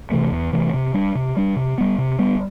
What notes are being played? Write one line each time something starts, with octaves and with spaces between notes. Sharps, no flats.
C3 E3 A3
E2
C3 E3 A3
C3
G3 D4
C3
G3 D4
C3
G3 B3
C3
G3 B3